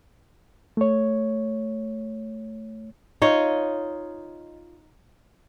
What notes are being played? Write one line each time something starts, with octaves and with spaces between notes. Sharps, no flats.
A3 C#5
D#4 F4 C#5 D#5